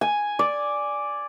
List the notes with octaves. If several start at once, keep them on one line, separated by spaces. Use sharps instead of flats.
G#5
D5